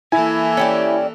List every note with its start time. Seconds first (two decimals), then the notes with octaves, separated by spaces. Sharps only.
0.12 E3 A#3 E4 A4 G#5
0.57 C#4 G4 D5